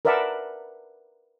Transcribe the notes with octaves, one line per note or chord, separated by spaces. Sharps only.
A#4 B4 D5 E5 F#5 A5